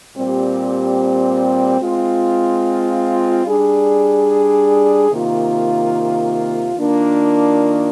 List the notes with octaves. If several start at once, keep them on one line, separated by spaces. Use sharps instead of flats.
A#2 G3 C4 G4
G#3 C4 F4
G3 D4 G#4
C3 D#3 A#3 F4
D#3 A#3 D4 F4